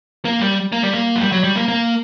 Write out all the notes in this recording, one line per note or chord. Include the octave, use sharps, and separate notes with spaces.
A#3
G3
A#3
G3
A#3
F#3
G3
F#3
G3
A#3
A#3